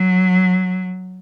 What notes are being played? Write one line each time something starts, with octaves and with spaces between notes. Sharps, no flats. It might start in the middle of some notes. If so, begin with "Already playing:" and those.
Already playing: F#3